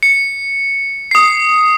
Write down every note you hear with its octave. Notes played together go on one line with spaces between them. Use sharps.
C#7
D#6 C7